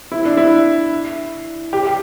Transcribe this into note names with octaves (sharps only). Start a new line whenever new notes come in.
E4
D4
E4
G4
G4